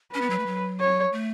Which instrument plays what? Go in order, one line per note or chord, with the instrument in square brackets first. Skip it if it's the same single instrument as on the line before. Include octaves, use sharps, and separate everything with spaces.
[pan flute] C#4 [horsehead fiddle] B4
[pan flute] B3
F#3
A3
F#3
[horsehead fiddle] C#5
[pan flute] A3